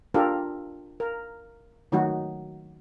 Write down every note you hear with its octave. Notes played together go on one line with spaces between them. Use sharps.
D4 F4 G4 A4 A#4
A#4
D#3 F#3 A3 D#4 F#4